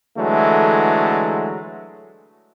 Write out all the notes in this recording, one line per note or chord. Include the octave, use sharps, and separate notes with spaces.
D3 E3 F#3 G#3 A3